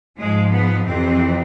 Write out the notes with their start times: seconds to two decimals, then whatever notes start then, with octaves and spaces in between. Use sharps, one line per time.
0.18 G#2 F3 G#3
0.52 B3
0.86 F2 C3 E3 C4